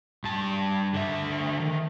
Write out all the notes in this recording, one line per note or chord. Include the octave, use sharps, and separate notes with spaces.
G2 A5
D3 E5
D#3